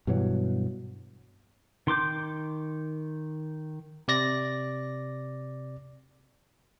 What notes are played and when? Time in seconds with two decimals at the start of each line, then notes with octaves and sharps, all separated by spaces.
0.07 G2 B2 E3 F#3
1.87 D#3 C6 D6 G6
4.08 C3 D5 A#6